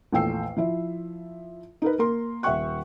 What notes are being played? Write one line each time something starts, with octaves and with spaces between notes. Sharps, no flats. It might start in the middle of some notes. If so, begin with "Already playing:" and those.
A#1 E2 A3 G5 E6 C7
F3 E4 E5
D#4 A#4 B4
A#3 A#4 C6
D#1 E5 F#5 G5 C#6 F#6